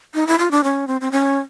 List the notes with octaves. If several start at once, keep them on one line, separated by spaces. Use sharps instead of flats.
D#4
E4
F4
D4
C#4
C4
C4
C#4